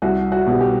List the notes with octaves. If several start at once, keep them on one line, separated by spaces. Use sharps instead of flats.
C2 F#4
F#4
B2 G3
G4